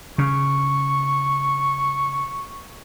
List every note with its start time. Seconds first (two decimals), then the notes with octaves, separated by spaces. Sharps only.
0.18 C#3 C#6